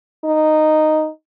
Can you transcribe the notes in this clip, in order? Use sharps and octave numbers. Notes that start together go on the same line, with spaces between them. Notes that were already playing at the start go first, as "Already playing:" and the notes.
D#4